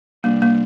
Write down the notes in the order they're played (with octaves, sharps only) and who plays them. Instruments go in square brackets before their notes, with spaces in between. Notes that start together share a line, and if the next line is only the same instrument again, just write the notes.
[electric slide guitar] C3 G3 D4 [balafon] A#3
[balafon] A#3